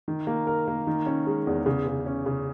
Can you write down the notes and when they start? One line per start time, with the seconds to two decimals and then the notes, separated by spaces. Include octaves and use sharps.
0.08 D#3
0.27 A#3
0.47 A#4
0.68 A#3
0.87 D#3
1.06 C#4
1.27 G#3
1.47 E2
1.66 C#3
1.87 C#3
2.06 C#4
2.26 C#3